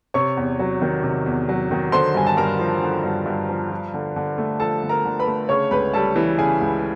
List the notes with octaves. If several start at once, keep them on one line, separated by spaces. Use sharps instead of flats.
C3 C#5 C#6
E2
F#3
D#3
C3
E2
F#3
D#3
D3 C5 C6
G2 G#5
A5
G2 A#4 A#5
F3
D3
G2
G2
F3
F3
D3
D3
A3
F3 A4 A5
D3
A#4 A#5
D3
B4 B5
A3
C#3 C#5 C#6
C#2 B4 B5
G3 A4 A5
E3
C#3 G#4 G#5
C#2